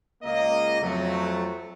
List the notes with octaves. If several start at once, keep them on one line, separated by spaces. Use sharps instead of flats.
C#2 A#3 D#5
F2 F#3 A3